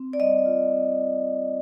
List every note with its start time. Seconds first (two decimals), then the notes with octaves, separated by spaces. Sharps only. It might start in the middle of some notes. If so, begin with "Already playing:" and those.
Already playing: C4
0.13 D5
0.20 G3 D#5
0.46 F4
0.73 C4